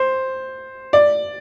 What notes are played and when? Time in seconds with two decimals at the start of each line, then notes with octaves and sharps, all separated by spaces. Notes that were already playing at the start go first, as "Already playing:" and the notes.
Already playing: C5
0.93 D5